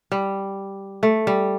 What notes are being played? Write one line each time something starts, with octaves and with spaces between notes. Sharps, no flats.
G3
A3
G3